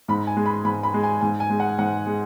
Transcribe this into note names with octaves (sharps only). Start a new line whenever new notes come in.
G#2 B5
G#5
G#3
B5
G#2 B5
B5
G#3
G#5
G#2 G#5
G#5
G#3
F#5
G#2 F#5
G#3